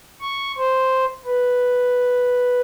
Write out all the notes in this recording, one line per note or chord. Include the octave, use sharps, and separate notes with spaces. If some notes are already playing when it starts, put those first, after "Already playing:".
C#6
C5
B4